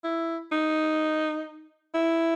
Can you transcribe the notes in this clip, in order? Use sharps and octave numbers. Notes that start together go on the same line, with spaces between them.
E4
D#4
E4